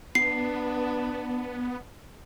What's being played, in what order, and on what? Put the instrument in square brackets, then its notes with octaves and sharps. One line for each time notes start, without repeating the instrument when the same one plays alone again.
[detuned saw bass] B3 [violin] D4 B4 [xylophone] C7